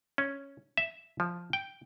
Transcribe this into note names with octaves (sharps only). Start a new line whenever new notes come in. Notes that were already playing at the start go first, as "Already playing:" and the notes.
C#4
E5
F3
G5